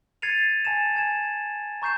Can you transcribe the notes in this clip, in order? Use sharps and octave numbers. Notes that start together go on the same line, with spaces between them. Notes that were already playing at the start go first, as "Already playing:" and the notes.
G#6 A6 C7 C#7 D#7 F7
G#5 A5 A6 E7
G#5 G#6 E7
A#5 C#6 G6 C7 E7